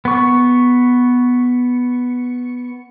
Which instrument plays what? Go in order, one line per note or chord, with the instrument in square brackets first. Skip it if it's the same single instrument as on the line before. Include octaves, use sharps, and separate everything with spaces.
[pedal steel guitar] B3 C#6